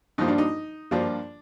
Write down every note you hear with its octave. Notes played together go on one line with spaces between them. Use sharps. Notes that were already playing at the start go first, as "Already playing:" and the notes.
G2 F3 A#3 D#4
D4
D#4
G2 F3 A#3 D4